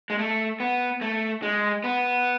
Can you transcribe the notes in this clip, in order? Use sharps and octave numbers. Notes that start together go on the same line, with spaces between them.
G#3
A3
B3
A3
G#3
B3